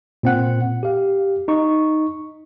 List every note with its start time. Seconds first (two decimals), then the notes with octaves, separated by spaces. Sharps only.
0.23 A#2 C4 F#5
0.83 G4 F5
1.48 D#4 C#6